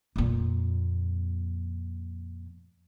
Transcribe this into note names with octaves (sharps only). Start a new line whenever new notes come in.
F2 A#2